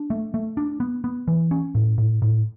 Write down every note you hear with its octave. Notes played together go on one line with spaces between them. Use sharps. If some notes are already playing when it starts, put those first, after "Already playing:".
Already playing: D4
A3
A3
D4
B3
B3
E3
C#4
A2
A2
A2